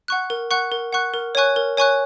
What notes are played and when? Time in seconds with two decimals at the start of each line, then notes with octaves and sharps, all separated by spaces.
0.08 F#5 C#6 F#6
0.30 A#4
0.51 F#5 C#6 F#6
0.72 A#4
0.93 F#5 C#6 F#6
1.14 A#4
1.35 C#5 G#5 C#6 F#6
1.56 A#4
1.77 C#5 G#5 C#6 F#6